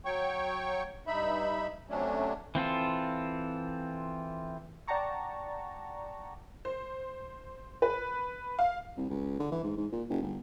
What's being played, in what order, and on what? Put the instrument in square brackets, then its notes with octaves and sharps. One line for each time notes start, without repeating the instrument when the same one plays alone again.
[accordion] F#3 C#5 G5 C#6
G2 D#4 E5 B5
C3 F#3 A3 C#4 D4
[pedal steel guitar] E3 C4 F4 A4
[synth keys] D5 F#5 G5 A5 A#5 C#6
[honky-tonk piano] C5
B4
F5
[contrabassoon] C2
C#2
D3
E3
G#2
G#2
A#2
F#1
G1